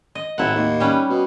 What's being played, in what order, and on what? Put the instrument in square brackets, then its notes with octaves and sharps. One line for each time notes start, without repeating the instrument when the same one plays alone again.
[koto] D#5
[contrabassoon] G#1 [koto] A2 E4 F#5
[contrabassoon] D#2
[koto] G3 C#4 B4
[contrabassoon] B2